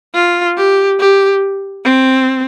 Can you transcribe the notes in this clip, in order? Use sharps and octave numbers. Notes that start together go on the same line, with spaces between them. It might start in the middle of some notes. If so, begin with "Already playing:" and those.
F4
G4
G4
C4